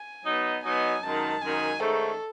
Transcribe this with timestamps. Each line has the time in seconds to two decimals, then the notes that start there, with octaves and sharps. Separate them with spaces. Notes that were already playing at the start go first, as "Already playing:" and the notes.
Already playing: G#5
0.25 F#3 B3 D#4
0.63 F#3 B3 D#4 G#5
1.02 F#2 D#3 G#3 A5
1.41 F#2 D#3 G#3 G#5
1.81 G#2 D#3 A3 C#4 A4